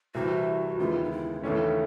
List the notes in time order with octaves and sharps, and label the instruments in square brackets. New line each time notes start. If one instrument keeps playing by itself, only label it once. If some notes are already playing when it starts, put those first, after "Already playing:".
[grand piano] C2 C3 E3 [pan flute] F#4
[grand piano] D#2 C#3 E3 G#3 B3 [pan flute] F4
[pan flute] D#4
E4
[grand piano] D#2 C#3 E3 A3 C#4 [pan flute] D4